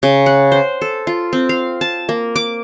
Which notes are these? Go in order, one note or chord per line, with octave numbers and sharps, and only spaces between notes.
C#3
F#5
C5
A4
F4
C4
F5
A5
A#3
D6